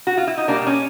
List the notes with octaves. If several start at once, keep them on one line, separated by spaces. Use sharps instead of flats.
F#4
F4
E4
D#4
B2 G3 A#3 D4
C#4